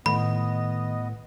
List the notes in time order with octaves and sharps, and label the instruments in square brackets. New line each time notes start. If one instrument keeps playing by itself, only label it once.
[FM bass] A2 [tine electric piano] D#3 [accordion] B3 D#5 [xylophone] B5